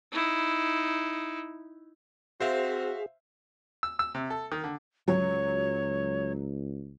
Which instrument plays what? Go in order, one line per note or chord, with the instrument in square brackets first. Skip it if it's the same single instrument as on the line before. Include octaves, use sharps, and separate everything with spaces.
[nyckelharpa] D#4 E4
[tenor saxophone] C4 [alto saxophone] F#4 [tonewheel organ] G#4 [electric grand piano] C5 E5 F5
[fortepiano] E6
E6
C3
A4
D#3
D3
[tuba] C#2 [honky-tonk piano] F#3 [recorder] C#5